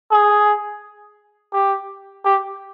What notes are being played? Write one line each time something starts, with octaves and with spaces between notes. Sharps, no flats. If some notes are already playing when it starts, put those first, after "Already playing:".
G#4
G4
G4